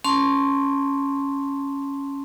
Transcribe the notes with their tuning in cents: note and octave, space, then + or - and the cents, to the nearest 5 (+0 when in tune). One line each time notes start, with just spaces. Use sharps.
C#4 +0 A5 +0 C6 +0